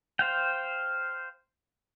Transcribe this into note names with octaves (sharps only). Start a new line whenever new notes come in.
C5 F5 G5